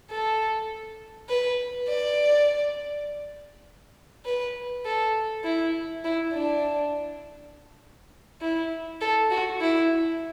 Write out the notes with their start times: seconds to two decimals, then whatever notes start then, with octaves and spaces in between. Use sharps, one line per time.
0.10 A4
1.29 B4
1.89 D5
4.25 B4
4.86 A4
5.44 E4
6.05 E4
6.33 D4
8.41 E4
9.01 A4
9.31 F#4
9.61 E4